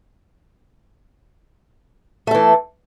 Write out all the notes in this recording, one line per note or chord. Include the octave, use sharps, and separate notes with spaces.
E3 A3 A4